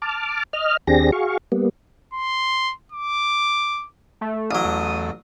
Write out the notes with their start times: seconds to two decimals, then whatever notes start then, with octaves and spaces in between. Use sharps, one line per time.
0.02 A5 D6 F6
0.53 D#5 F6
0.87 D#2 C4 D4 G4 G#4 A#6
1.12 F#4 G#4 F5 C#6
1.52 G3 A#3 B3
2.14 C6
2.92 D6
4.21 A3
4.51 A1 F#3 D#6
4.64 E2 A3